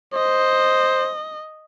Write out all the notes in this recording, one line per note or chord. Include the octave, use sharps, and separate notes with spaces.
C5 D#5